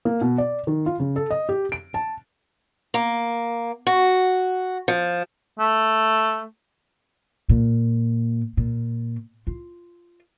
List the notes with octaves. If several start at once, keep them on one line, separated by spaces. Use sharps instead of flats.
A#3
B2
D5
D#3
F4
C#3
A4
D#5
G4
D7
A5
A#3
F#4
F3
A3
A#2
A#2
F4